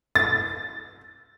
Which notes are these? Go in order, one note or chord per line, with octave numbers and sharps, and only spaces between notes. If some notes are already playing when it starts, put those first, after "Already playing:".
A6